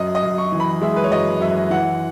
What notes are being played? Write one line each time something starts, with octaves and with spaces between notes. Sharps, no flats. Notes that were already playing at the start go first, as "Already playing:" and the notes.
Already playing: F#2 D#5
D#5
F#2
C#6
E3
B5
G#3 E5
B4
C#5
F#2 D#5
F#2 E5
E3 F#5